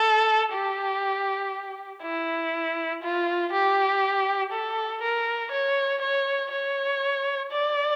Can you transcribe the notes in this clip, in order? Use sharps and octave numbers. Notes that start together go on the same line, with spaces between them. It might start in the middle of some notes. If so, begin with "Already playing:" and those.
Already playing: A4
G4
E4
F4
G4
A4
A#4
C#5
C#5
C#5
D5